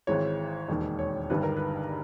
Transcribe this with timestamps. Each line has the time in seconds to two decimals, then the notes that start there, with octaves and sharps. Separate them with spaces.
0.07 G#1 G#2 E3 C#5
0.68 E1 D#2 D#3
0.99 C#5
1.30 G1 G2 D#3 B4
1.43 A#4
1.57 B4